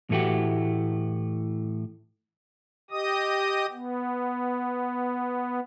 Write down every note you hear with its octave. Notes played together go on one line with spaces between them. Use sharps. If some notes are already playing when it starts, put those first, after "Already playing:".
A2 E3 A3 F#4 G4
G4 D#5 D#6
B3